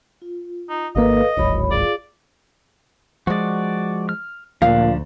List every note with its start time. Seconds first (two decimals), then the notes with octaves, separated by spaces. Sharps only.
0.22 F4
0.69 D#4
0.96 G#1 A#3 A4 B4 D#5 F5
1.37 D1 G#1 C#5 B5
1.71 F4 G#4 D5 F5
3.27 F3 G#3 F#4 D5
4.09 F6
4.62 D2 A#2 F3 D4 F5